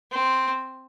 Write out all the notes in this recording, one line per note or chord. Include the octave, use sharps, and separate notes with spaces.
C4